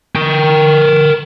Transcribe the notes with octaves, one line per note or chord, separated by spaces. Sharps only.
A#4 G5